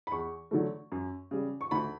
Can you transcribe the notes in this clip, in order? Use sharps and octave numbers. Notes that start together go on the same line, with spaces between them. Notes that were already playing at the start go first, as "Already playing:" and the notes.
B5
E2 C#6
D3 F#3 A3
F#2
C#3 G3
C#6
D2 B5